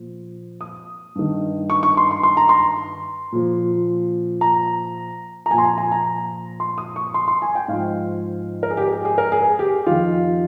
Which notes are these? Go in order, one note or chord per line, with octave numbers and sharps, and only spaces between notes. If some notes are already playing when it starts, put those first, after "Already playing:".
Already playing: A#2 F3
D#6
G2 D#3
C#6
C#6
C6
C6
C6
A#5
C6
A#2 F3
A#5
A#5
A#2 F3 G#5
C6
A#5
G#5
A#5
C6
D#6
C#6
C6
C6
G#5
G5
G#2 F3 F5
A#4
G#4
G4
G#4
G#4
A#4
G#4
G4
F2 D#3 F4